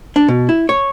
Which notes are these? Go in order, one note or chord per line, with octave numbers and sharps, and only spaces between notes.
D4
B2
E4
C#5